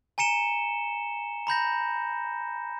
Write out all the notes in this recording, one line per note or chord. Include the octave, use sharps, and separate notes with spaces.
G#5 A#5 C#7 E7 G7
A#5 B5 G6 A#6